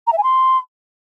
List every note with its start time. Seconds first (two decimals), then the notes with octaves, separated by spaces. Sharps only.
0.07 A#5
0.12 E5
0.18 G#5
0.23 C6